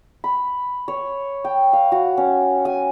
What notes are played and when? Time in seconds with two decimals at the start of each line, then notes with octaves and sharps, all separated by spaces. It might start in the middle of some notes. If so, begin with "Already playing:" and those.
0.24 B5
0.88 C#5
1.45 G5
1.73 F5
1.92 F#4
2.17 C#4
2.65 G#5